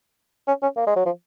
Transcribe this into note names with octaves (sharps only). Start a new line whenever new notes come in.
C#4
C#4
A#3
G#3
F#3
F3